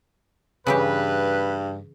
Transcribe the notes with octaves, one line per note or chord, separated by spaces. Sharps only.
G2 C#3 E3 G4 B4